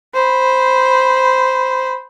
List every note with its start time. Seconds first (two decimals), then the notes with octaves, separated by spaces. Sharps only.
0.14 C5 B5